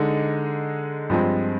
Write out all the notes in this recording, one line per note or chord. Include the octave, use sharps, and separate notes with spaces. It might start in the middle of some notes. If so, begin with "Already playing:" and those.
Already playing: D3 G#3 D#4
G2 F3 G#3 C4